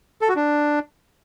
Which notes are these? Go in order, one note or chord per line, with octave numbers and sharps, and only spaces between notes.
A4
F#4
D4